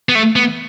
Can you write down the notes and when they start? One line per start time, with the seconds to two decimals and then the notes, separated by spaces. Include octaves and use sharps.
0.09 B3
0.15 A3
0.36 B3